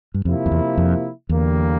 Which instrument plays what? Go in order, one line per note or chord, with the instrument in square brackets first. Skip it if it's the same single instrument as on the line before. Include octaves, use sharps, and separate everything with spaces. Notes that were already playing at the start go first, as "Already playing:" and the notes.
[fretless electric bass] G2
[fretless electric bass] F2 [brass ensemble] C3 F3 A#3 E4
[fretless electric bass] F2
E2
F2
[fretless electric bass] E2 [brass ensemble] D3 G3 A#3